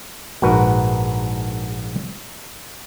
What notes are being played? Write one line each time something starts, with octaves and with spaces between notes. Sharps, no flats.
A#1 G#2 F#4 A#4 B4